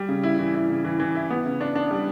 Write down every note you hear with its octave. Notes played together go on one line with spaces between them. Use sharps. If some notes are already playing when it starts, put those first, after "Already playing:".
Already playing: G3
C#3
E4
E3
E4
C#3
E3
E3
E4
B3
C#3
D4
D4
G3